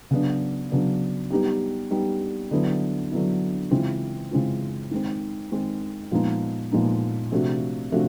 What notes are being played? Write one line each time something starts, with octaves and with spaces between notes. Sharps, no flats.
C#3 F#3 B3 D4
C#3 F#3 B3 D4
G3 B3 D#4 G4
G3 B3 D#4 G4
D3 F#3 B3 E4
D3 F#3 B3 E4
C#3 E3 G#3 C4 F4
C#3 E3 G#3 C4 F4
D#3 G#3 C4
D#3 G#3 C4
A#2 F3 G#3 B3 D#4
A#2 F3 G#3 B3 D#4
C3 F3 A3 D4 F#4
C3 F3 A3 D4 F#4